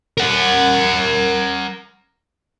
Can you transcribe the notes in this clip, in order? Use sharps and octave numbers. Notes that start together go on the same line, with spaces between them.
A#4 F#5